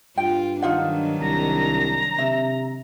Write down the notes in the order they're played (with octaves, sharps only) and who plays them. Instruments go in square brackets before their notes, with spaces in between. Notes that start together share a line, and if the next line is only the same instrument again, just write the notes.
[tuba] G2 [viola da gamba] F4 [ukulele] G5
[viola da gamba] D#3 F#3 D4 [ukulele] D#4 F4 F#5
[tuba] C2 [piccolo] A#5
[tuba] C3 [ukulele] E5